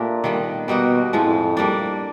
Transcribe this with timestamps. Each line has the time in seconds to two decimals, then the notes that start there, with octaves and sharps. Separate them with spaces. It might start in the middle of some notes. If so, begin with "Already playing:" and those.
Already playing: A#2 A3 D4 G4 A#4
0.24 D#3 G3 B3
0.68 B2 G3 A#3 D#4 F#4
1.13 F2 A2 F3 G#3
1.57 G3 A#3 D4